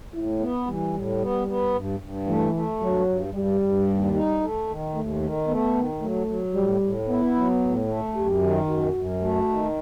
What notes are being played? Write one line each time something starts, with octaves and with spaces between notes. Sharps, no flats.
A2 E4
B3
E3 G3
A2
B3
B3
G2
G2
E3 A3
A3
G2 F#3
G2
G2 G3
G2
D#2
D#4
A3
D#3
D#2 A3
D#3
A3 B3
D#3
F#3 A3
F#3
A2 G3
A2
B3 E4
F#3
A2
A3
F#2 G4
D#3
F#2 F#4
F#2
A3 F#4
D#3